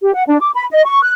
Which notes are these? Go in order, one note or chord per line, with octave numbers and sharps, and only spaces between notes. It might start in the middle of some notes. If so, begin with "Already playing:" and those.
G4
F#5
D4
D6
B5
D#5
C#6
F#6